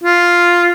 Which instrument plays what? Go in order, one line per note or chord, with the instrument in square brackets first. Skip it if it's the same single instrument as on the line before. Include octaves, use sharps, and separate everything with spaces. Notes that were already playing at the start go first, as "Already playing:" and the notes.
[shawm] F4